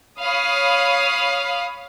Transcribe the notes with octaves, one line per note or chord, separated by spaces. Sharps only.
C#5 F5 B5 D#6